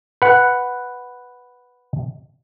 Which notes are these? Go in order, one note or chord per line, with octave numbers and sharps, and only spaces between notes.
B4 F#5